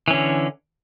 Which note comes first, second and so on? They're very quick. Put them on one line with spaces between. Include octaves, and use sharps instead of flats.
E3 C#4 D3